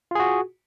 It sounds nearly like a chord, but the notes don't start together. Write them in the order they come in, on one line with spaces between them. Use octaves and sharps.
F4 G#4 F#4